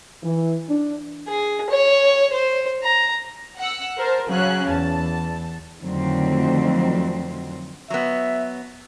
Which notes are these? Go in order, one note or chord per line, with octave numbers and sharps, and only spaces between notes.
E3
D4
G#4
C#5
C5
A#5
F#5 E6
A#4 C5 A5
C#3 F#3 C#4 F#6
E2 A5
F2 D3 D#3 F#3 A3 C4
F#3 B3 E5